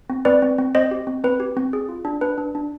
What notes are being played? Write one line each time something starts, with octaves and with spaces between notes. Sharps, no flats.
C4
C4 B4 D5
C4
C4
C4 C5 D#5
G4
C4
C4 B4
G4
C4
G#4
F4
D4
D4 B4
D4
D4